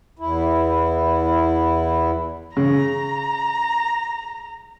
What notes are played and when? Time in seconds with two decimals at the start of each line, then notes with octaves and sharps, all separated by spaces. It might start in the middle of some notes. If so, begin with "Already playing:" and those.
0.19 E2 E4
2.57 C#3 A#5